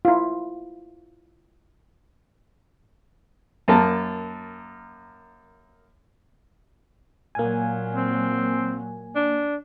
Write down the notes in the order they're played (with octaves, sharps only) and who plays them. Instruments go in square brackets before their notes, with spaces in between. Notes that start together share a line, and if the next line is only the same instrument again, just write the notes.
[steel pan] E4 F4
[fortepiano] F#2 A#3 A5
[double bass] A#2 F#3 [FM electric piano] A#3 G#5
[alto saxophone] C4
D4